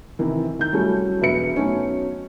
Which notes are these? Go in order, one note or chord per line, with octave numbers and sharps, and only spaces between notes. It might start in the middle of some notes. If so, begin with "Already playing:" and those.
C3 D#3 E3
D#3 G6
F#3 G3 A3 C#4 E4 A4
E1 B2 F#3 B4 E5 C#7
F#3 A3 B3 C#4 D#4